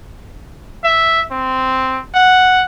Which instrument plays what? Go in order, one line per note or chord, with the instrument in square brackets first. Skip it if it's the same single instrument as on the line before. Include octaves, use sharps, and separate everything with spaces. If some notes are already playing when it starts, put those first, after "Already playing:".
[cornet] E5
C4
F#5